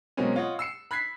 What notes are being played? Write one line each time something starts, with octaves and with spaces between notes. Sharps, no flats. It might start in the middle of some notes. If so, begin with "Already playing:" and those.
B2 F#3 G#3 A#3 C4 C#4
F4 C#5 D#5 F#5
E6 C7 C#7 E7
B5 F#6 G#6 B6 C7